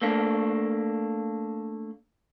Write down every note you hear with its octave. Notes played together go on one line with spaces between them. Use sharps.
A3 A#3 D4